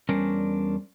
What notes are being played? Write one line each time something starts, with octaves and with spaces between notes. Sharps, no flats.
E2 G3 C#4 D4 A#4 C5